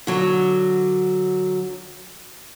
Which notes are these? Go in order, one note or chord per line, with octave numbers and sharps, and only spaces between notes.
D3 F#3